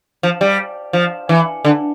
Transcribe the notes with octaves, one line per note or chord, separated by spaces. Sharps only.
F3
G3
F3
E3
D3